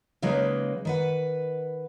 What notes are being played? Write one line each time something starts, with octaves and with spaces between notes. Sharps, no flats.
C#3 F#3 G#3 A#3 D#4 B4
D#3 B4 F#5